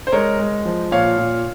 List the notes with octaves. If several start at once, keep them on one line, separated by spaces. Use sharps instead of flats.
C5
G#3 A#4 C#5
G#3
F3
A#2 C#5 F5
A#2